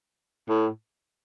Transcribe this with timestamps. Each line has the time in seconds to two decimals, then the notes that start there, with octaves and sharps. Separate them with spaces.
0.49 A2